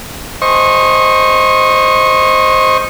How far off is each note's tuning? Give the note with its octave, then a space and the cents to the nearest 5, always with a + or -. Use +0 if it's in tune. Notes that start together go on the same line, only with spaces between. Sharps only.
C5 +0 D#5 +0 C#6 -20